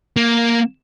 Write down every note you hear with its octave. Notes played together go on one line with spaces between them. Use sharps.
A#3